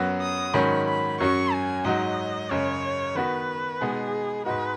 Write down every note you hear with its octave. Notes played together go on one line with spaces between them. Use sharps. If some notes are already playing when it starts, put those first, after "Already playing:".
Already playing: F#2 F#3 B3 F#4
D#6
G#2 D#3 F#3 C#4 B5
B5
F#2 F#3 C#4 F#4 C#6
G#5
G#2 F#3 D#4 F#4 D#5
F#2 C#3 G#3 C#4 C#5
D#3 B3 F#4 B4
B2 G#3 B3 D#4 G#4
G#2 G#3 D#4 F#4 B4